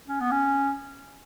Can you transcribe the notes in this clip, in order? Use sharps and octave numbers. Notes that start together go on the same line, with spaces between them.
C#4
B3
C#4